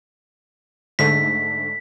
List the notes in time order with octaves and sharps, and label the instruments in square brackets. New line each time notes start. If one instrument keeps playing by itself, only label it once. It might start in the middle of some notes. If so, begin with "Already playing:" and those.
[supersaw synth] G#2 D3 A3 [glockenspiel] B6